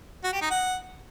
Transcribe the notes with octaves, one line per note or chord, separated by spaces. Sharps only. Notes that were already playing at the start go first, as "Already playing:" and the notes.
F#4
G4
D#4
F#5